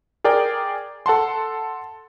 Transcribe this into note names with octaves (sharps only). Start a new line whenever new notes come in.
G#4 A#4 D5 G5
A4 F#5 A5 C6